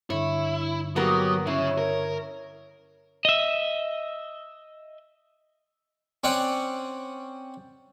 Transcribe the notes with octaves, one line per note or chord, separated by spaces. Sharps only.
G2 D3 E4 C#5
F#3 A#3 B3 G4 A#4 D#6
C#3 E4 C#5
A#4
D#5 E5
C4 C#4 D5 F#5